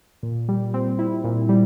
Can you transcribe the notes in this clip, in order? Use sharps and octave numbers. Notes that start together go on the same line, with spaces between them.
A#2
G3
C4
E4
A#2
G3